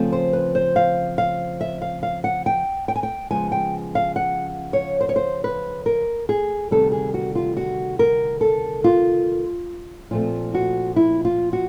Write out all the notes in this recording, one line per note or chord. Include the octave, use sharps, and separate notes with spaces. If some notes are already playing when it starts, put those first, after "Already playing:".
Already playing: C#3 F3 A3 C4
C5
B4
C5
F5
F5
E5
F5
F5
F#5
G5
G5
G#5
G5
C#3 F3 G#3 B3 G#5
G5
F5
F#5
C#5
C5
C#5
C5
B4
A#4
G#4
D2 C3 D#3 G3 B3 A4
G#4
F#4
F4
F#4
A#4
A4
F4
A#2 F3 A3 C4 F4
F#4
E4
F4
F#4